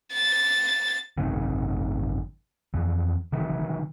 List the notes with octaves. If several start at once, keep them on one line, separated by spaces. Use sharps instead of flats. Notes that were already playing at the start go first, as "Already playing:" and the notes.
A6
G#1 F#2 C3 D#3
F2 E3
C3 D#3 E3 F#3